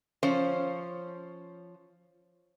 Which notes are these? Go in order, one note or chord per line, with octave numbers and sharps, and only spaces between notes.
F3 C#4 C5